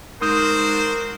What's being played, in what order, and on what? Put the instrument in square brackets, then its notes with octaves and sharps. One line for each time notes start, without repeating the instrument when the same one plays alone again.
[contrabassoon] G#2 [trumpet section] D4 F#4 C5 [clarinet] A#4 [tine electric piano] C6 D#6 G6